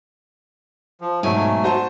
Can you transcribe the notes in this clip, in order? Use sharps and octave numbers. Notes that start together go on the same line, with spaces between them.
F3
G#2 B2 F#3 A3 G#5
F#4 C5 A5